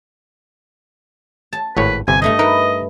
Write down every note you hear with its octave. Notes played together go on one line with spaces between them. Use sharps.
A5
G#1 A2 B4 C#5
G1 C3 G#5
G2 A3 D#5 A#5
D#4 A#4 B4